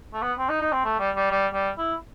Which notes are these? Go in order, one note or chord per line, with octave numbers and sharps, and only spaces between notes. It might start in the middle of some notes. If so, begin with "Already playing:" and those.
A3
B3
C4
D#4
D#4
C4
A3
G3
G3
G3
G3
E4